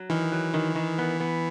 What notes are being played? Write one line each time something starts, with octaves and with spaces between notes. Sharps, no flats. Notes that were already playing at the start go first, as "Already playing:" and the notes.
Already playing: F#3
D#3 E3
F#3
D#3
D#3
B3
B3